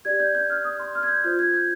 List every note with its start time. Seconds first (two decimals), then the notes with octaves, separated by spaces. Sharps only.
0.05 G4 D5 G#6
0.20 G6
0.35 G6
0.50 F6
0.64 D#6
0.80 C6
0.95 F6
1.03 G#6
1.09 G6
1.24 F4 C5 G6
1.39 G#6
1.54 G6